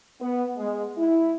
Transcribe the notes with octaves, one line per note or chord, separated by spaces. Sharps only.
B3
G#3
E4